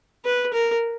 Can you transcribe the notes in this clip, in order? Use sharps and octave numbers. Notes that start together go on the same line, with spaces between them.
B4
A#4